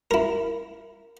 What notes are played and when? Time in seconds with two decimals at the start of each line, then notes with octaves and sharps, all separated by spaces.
0.11 E4 A#4